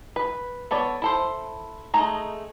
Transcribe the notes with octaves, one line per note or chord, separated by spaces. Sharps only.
B4
B3 A4 C#5 D5
E4 A4 C5
G#3 A3 D#4 A#5